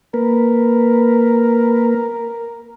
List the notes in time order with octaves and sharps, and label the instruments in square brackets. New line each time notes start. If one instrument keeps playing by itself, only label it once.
[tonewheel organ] A#3 B4 [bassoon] A#4